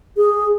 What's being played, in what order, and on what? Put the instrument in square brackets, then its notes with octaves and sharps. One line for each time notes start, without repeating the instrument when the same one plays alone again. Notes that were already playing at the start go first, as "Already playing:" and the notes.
[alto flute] G#4